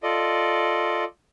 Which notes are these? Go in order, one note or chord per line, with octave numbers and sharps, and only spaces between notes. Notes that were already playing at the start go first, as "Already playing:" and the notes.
F4 A4 D5 D#5